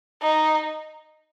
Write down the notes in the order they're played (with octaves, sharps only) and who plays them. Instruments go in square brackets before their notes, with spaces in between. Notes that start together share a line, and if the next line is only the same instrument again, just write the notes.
[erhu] D#4